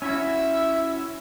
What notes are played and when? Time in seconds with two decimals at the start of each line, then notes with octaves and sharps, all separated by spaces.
0.02 C#4 E4 F#4 E5